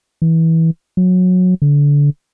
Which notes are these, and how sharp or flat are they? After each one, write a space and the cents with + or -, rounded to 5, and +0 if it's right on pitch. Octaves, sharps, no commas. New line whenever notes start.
E3 -20
F#3 -20
D3 -25